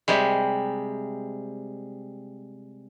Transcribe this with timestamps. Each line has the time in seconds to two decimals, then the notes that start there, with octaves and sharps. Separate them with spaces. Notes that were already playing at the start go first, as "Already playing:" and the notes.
0.08 C3 G3 G#3